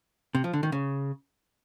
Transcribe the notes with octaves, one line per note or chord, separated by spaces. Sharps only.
C3
F3
D3
D#3
C#3